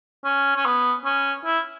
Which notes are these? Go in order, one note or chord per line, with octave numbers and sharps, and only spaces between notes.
C#4
C#4
B3
C#4
E4